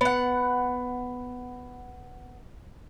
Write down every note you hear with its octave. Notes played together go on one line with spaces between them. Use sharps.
B3 F#5